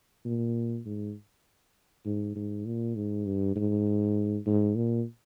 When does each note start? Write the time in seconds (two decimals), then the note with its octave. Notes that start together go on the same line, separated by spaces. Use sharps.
0.25 A#2
0.86 G#2
2.06 G#2
2.36 G#2
2.66 A#2
2.96 G#2
3.26 G2
3.56 G#2
4.46 G#2
4.76 A#2